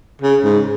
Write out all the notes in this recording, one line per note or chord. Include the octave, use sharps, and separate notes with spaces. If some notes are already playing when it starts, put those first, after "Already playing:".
C#3
G#2